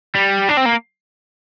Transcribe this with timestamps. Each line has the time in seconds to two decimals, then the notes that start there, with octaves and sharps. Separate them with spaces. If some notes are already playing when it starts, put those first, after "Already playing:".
0.15 G3
0.49 D4
0.57 C4
0.66 A#3